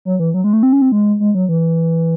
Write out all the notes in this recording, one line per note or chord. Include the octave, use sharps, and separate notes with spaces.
F#3
E3
F#3
G#3
A3
C4
C#4
C4
G#3
G#3
F#3
E3